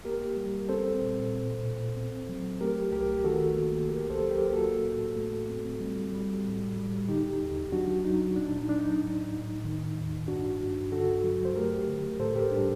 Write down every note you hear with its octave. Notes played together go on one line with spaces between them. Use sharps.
A#3 G4 A#4
G3
C4 A4 C5
A#2
A#2
A#2
C4
F#3
A3 G4 A#4
C2 G4 A#4
D#3 F#4 A4
A#3
C2 G4 A#4
A4 C5
F#3
G4 A#4
A#3 F#4 A4
A2
A3
C4
G3
G3
A2
G3
D3 D#4 G4
D#2
F#3 D4 F#4
F#3 D#4
A#2 D4
D#4
F#3 D4
D#4
A2
A2
D#3
D#2
G2 D4 F#4
G2
D3 F#4 A4
F#3
C5
A3 G4 A#4
D3
A2 A4 C5
G4 A#4
G3 D4